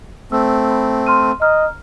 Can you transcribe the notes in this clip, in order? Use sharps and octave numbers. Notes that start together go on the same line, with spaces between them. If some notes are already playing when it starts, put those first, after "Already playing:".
A3 C4 E6
B5
C6 F6 D#7
D#5 A#5 F6